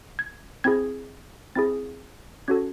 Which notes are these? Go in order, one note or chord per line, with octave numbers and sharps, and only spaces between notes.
G#6
C4 E4 G#4 G#6
C4 E4 G#4 A6
C#4 F#4 A4 G#6